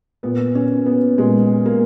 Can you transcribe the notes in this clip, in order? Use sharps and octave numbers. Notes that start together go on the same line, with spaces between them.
A#2 B3
C#4
B3
A#2 G#3
A#3